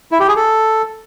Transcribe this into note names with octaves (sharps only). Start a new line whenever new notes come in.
E4
G4
G#4
A4